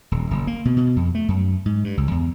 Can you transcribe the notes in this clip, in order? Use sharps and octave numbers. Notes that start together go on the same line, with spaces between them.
D#1
F#1
A#3
B2
B2
F2
A3
F#2
G#2
G2
C#2
E2